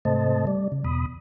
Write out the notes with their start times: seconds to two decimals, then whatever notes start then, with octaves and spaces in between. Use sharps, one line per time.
0.05 G#2 C3 A3 C5 D#5 A5
0.47 G3 D5
0.72 C#3
0.84 E2 B2 B5 D#6